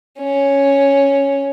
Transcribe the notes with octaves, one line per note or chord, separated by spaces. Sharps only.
C#4